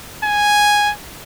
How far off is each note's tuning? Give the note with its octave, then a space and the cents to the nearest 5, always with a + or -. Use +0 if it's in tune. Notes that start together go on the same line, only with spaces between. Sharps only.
G#5 -5